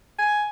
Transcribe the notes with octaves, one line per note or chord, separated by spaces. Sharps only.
G#5